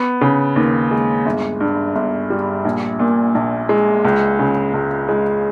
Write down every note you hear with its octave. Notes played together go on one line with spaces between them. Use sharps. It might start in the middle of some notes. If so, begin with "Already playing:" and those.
Already playing: B3
C#3
D#2
G#3
G1
G2
G1
G3
A#1
A#2
A#1
G#3
C#2
C#3
C#2
G#3